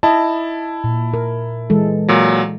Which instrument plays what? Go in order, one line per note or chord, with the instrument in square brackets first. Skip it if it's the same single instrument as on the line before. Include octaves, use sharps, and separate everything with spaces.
[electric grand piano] E4 A5 [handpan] D#5
[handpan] A#2
A#4
E3 G#3 A4
[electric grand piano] A#2 F#3